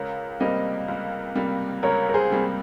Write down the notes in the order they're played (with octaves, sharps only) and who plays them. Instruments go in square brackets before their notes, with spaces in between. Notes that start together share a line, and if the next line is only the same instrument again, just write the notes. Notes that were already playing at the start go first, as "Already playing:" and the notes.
Already playing: [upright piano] C#2 [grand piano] A#4 C#5
[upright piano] C3 G3 A#3 [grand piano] C5 D#5
[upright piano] C#2
C3 G3 A#3
[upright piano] C#2 [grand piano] A#4 C#5
[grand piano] A#4
G#4 C5
[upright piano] C3 G3 A#3